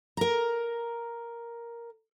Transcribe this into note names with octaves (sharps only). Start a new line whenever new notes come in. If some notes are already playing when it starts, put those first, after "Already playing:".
A#4 A#5